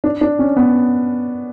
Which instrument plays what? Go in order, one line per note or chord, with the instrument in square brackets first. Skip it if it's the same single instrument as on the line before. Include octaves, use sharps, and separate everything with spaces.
[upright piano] D4
D4
C#4
B3